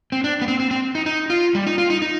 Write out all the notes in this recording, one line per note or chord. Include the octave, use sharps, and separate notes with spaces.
C4
D4
B3
C4
C4
C4
D#4
D#4
F4
G3
D#4
F4
D#4
D#4